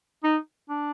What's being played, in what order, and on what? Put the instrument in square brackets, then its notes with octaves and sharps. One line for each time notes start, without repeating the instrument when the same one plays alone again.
[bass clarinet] D#4
D4